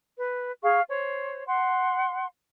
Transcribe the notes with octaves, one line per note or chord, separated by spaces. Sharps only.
B4
G#4 F5 C#6
C5 C#5
F#5 C6